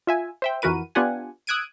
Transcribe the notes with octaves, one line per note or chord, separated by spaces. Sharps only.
F4 E5 G#5
C5 E5 G5
F2 E3 F#4 A#4 B4 D#7
B3 D4 F4 G4 F#5 G#5
D#6 E6 F#6 G#6 D7 D#7